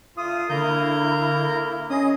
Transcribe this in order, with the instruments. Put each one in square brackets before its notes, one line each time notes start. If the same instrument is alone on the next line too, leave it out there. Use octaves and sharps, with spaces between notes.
[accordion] D3 A3 [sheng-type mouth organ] F4 [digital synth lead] D#6
[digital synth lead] D3 [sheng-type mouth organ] A#3 A#4 G6 [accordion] E4
[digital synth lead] C#4 [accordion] G#4 D#5 [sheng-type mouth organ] D#6